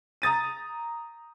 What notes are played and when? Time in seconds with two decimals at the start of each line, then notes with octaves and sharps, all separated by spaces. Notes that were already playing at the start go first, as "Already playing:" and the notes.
0.22 A#5 D#6 A6 D#7